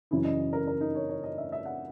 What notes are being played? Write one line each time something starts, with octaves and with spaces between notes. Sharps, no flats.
F#2 C#3 E3 E4
D#5
A#4
A#4
D#4
C#5
C#5
D#5
E5
E5
F#5